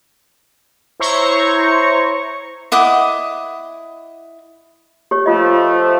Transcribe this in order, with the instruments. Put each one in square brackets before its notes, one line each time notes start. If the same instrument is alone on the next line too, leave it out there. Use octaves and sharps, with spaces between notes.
[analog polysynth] E4 C5 C#5 A#5 C#6
[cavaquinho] E4 D#5 F#5 D6
[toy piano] G4 C#5
[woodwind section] F3 A3 [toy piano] F4 D#5